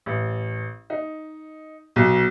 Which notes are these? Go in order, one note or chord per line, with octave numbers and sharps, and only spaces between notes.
A1
D#4
B1